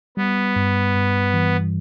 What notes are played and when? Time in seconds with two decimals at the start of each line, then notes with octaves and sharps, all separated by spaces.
0.17 G3 B3
0.56 G2
0.95 G2
1.34 E3